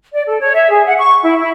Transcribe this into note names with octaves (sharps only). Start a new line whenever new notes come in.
D5
A4
C#5
E5
G#4
F#5
C#6
E4
E4